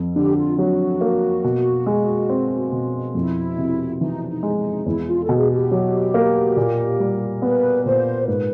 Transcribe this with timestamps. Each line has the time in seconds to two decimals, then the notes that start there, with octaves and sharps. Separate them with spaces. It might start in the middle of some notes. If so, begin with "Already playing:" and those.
Already playing: F2
0.15 D3 G4
0.37 F4
0.58 F#3 F#4
1.01 A#3
1.44 B2
1.86 G#3
2.29 C4
2.72 B2
3.15 F2 E4
3.58 C3
4.01 E3 D#4
4.24 D4
4.28 D#4
4.43 G#3
4.57 D#4
4.86 E2 E4
5.07 F4
5.23 A4
5.29 B2
5.37 G#4
5.50 G4
5.71 F#3
6.14 A#3
6.57 A#2
7.00 G3
7.42 B3 B4
7.85 A#2 C5
8.28 G#2 B4